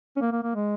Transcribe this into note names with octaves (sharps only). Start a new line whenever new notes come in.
C#4
A#3
A#3
A#3
G#3